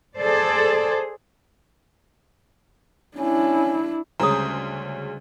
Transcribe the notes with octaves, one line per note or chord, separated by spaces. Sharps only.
G#4 A4 C5 D5
C#4 D4 E4
D2 C#3 G3 G#3 C#4 C5 A#5 D#6